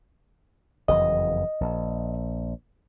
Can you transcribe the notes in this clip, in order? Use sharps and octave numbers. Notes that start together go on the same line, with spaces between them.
F#1 F2 E3 D#5
A#1